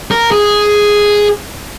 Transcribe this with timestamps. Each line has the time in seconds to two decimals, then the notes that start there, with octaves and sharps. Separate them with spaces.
0.11 A#4
0.32 G#4